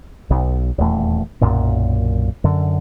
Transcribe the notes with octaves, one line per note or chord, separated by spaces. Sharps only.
B1
D#1 E2 A3
B1 F#2 A#2
F#2 D3